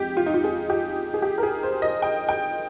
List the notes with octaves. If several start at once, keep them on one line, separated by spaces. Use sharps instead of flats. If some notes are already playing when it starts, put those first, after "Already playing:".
Already playing: F2 G#3 G4
F4
D#4
F4
G#4
G4
G#4
G4
A#4
G#4
C5
D#5
G5
G5